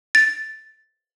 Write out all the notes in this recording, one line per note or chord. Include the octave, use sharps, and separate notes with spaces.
A6